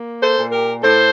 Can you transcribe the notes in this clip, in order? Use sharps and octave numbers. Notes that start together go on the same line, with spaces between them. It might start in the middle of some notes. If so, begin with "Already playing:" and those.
Already playing: A#3
A4 C5
A#2
G4 A#4
A2 A4 C5